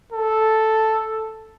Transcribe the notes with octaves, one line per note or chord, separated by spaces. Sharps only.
A4